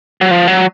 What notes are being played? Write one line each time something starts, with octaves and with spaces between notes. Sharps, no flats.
F#3
F3
F#3